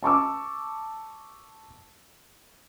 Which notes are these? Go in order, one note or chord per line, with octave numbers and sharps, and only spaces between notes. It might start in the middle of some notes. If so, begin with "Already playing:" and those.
A5 C#6 D6 E6